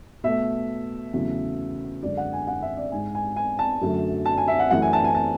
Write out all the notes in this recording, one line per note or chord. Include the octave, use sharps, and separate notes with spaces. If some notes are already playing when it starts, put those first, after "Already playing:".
B2 A3 E5
E2 C#3 F#3 A3
F#2 D3 G#3 D5
F#5
G#5
F#5
E5
D5
G#2 G#3 G#5
G#5
G#5
A5
F#2 D3 F#3 A3
A5
G#5
E5
F#5
F#2 E3 A3 F#5
G#5
A5
G#5
A5